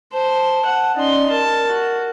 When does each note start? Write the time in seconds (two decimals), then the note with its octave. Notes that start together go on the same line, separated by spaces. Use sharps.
0.12 C5 A5
0.65 F#5
0.96 C#4 D#4 D5 C6
1.30 A#4 A5
1.69 F#4